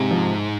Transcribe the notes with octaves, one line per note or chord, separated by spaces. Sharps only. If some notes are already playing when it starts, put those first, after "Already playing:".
Already playing: G#2 C3
F3